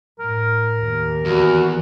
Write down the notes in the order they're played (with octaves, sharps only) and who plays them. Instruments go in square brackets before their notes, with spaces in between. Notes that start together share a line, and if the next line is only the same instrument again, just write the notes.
[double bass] A2 [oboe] A#4
[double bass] D#2
[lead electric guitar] E2 [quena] F#4